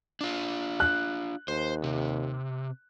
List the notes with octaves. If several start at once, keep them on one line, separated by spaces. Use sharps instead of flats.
D4 F4
F#6
D#2 C5
C3